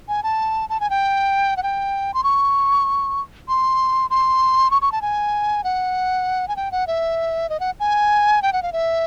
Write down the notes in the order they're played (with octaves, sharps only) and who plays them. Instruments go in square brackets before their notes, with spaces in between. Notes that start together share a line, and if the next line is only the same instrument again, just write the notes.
[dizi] G#5
A5
A5
G#5
G5
F#5
G5
C6
C#6
C6
C6
C#6
C#6
A5
G#5
F#5
G#5
G5
F#5
E5
D#5
F#5
G#5
G5
F#5
F5
E5